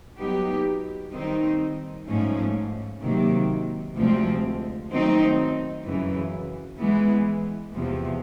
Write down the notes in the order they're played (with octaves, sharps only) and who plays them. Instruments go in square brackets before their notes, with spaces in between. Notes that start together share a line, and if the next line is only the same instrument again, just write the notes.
[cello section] F#3 B3 D#4 G4
D#3 G3 C4 D#4
G#2 F3 A3 C#4
C3 D#3 F#3 A#3
D2 C3 F3 G#3 C4
D#3 F#3 A3 C4 D#4
F#2 C#3 E3
E3 G#3 B3
E2 C3 F3